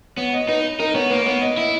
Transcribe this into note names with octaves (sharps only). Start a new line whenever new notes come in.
B3 C#5
D#5
D#4 B4
D#4 A#4
B3 C#5
A#3 B4
B3 C#5
D#5
E4 D#5